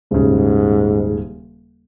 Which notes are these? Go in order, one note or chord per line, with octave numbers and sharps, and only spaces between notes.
D#1 G#2 C#3